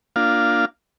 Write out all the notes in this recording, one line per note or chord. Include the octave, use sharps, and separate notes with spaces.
A#3 D4 F4 F5